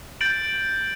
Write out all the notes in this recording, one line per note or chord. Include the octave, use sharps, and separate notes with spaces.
G6 A6 D7 F#7